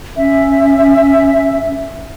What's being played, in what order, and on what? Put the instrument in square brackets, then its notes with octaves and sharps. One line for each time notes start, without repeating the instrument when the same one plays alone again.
[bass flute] C#4 [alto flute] E5